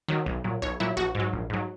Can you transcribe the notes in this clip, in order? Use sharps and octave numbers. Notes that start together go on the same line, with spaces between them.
D#3 F#3
B1
A#2 F#3
B1 C#5
A#2 F#3 E4
A#1 F#4
G#2 F#3
A#1
G#2 F#3